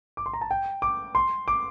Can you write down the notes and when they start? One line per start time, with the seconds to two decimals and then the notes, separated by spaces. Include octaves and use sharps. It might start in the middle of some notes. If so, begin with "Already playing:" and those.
0.17 D6
0.26 C6
0.33 A#5
0.41 A5
0.51 G5
0.82 D6
1.15 C6
1.48 D6